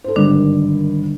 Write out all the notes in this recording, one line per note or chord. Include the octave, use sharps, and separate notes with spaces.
A4 C5
G#1 G2 D3 D#3 D4